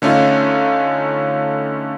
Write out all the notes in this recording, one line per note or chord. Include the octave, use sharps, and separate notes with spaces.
D3 A3 C#4 D#4 F4